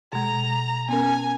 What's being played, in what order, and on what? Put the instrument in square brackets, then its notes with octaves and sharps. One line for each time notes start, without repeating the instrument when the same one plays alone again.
[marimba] B2 G#3 [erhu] A#5
[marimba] B3 C#4 A#4 [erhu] G#5